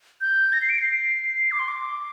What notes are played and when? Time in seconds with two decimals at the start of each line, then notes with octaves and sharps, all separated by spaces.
0.21 G6
0.53 A#6
0.62 C7
0.69 D7
0.78 C7
1.51 D6
1.59 C6
1.68 D6